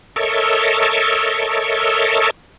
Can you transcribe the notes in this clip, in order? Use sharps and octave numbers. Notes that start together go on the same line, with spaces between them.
A4 A#4 C#5 D#5 E5 A5